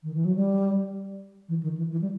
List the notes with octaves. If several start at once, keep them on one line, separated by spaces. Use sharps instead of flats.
D#3
E3
F#3
G3
E3
D#3
E3
E3
G3